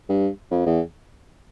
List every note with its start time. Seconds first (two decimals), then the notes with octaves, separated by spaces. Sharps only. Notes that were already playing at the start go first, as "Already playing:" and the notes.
0.09 G2
0.51 F2
0.66 E2